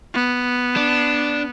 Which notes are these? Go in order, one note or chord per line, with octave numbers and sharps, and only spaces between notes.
B3
D4